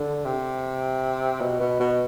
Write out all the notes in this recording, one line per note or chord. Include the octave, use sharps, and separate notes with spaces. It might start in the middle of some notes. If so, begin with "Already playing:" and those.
Already playing: D3
C3
B2
B2
B2